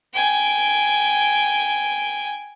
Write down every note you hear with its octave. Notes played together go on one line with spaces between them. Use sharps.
G5 G#5